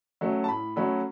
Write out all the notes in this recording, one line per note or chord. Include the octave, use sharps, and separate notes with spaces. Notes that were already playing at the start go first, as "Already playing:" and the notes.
F#3 A3 C#4
A5
A2 B5
F#3 A3 C#4 B5